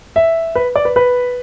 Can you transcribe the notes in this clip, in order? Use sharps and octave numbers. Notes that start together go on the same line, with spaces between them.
E5
B4
D5
B4
B4